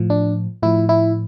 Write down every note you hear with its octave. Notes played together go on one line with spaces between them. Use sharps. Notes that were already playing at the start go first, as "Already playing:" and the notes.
Already playing: A2 F3
D4
A2 F3 E4
E4